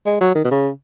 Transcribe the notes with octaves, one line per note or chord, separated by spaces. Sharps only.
G#3
F#3
D#3
B2
C#3